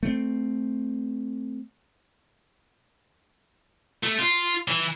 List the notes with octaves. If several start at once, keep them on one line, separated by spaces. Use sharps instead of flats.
A3 C4
A3
F4
E3